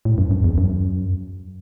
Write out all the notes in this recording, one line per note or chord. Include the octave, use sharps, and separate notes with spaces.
A2
F#2
F#2
E2
F#2